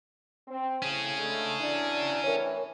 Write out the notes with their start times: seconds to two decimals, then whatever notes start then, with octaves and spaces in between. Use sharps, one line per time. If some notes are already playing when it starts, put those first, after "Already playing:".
0.48 C4
0.82 A2 C#3 C#4 G#4
1.18 D3 G#3 A3
1.60 E3 F#3 D4
2.24 A2 E3 A#4 C#5